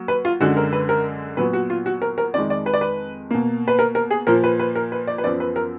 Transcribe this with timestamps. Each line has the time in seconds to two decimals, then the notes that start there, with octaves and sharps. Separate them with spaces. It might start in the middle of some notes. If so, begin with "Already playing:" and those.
Already playing: F#3 A#3
0.08 B4
0.25 F4
0.40 F#2 D3 G#3 F#4
0.57 A#4
0.73 B4
0.89 A#4
1.37 A#2 F#3 B3 B4
1.53 F#4
1.70 F4
1.86 F#4
2.02 A#4
2.18 A#4
2.34 F2 D#3 G#3 D5
2.50 D5
2.66 B4
2.74 D5
2.81 B4
3.31 B2 A#3
3.68 B4
3.79 A#4
3.95 A#4
4.11 G#4
4.27 A#2 F3 A#3 A#4
4.44 B4
4.59 B4
4.75 A#4
4.92 B4
5.07 D5
5.18 B4
5.24 F#2 F3 B3 D5
5.40 B4
5.56 A#4